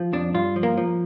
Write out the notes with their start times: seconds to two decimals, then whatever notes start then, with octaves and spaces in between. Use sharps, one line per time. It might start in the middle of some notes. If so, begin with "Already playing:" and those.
Already playing: F3
0.13 F2 D4
0.34 G2 F4
0.56 F3
0.63 A#3
0.77 F3